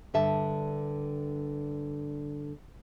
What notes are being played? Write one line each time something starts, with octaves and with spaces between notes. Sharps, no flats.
G2 D3 E5 A5